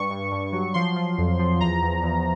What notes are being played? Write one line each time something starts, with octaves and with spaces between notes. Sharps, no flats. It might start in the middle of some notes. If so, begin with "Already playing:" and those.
Already playing: G2 C#6
G2
G2
F#3
F3 C6
F3
F2
F3
E2 A#5
E2
E2